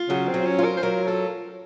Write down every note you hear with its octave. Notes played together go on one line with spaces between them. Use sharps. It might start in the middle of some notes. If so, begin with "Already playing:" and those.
Already playing: F4
C#3 F#3
C4
F#3
C#4
F4
A#4
C5
F#3 A#4
F4 A4